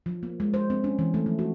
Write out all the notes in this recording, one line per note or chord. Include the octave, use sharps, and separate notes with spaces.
F3
A#3
G#3
C5
C4
C#4
E3
A3
F3
F#4